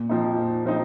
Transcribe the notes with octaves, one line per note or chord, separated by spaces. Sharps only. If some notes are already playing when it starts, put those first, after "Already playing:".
Already playing: A#2
F3 C4 D#4
A#2
F3 C4 D#4